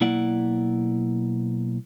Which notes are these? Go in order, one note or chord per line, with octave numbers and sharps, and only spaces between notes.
B1 A#3 E4 D5 F#5